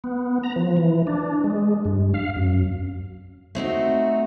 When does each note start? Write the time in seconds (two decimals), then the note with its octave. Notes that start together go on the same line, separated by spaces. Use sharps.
0.04 B3
0.43 A#5
0.56 F3
0.77 E3
1.07 D4
1.44 G#3
1.85 G2
2.14 F5
2.36 F#2
3.55 A3 C4 D#4 F#4